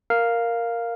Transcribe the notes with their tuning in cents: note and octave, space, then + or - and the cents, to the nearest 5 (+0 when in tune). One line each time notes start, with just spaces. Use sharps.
A#4 +0 F5 +0